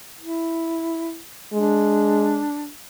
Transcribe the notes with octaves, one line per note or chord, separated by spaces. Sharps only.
E4
G#3 D4